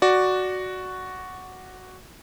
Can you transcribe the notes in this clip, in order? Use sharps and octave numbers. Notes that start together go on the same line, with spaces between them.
F#4 D5